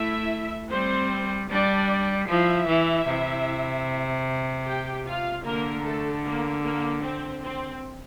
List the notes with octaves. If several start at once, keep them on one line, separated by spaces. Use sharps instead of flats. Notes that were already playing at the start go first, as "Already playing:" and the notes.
Already playing: A3 E4 E5
G3 C4 C5
G3 D4 D5
F3 E4 E5
E3
C3
G4 G5
F4 F5
D3 A#3 A#4
A3 A4
A#3
A#3
C4
C4